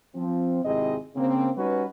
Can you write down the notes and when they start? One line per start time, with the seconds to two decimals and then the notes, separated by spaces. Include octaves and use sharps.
0.15 F3 C4
0.65 G#1 C3 C4 E4 G#4 D#5
1.16 C#3 A#3 C4
1.57 G3 C#4 D#4 F#4 B4